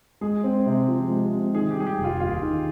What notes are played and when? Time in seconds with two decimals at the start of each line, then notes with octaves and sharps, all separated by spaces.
0.21 G#3 G#4
0.44 C4
0.66 C3
0.88 F3
1.10 G#3
1.32 C4
1.54 D#3 G#4
1.71 G4
1.77 G3 G#4
1.87 G4
1.98 F1
2.04 F4
2.20 D#2 F4
2.42 D#3